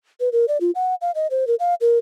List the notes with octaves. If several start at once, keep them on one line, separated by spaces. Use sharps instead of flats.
B4
A#4
D5
F4
F#5
F5
D#5
C5
A#4
F5
A#4